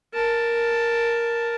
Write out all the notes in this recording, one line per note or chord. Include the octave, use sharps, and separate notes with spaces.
A#4 A5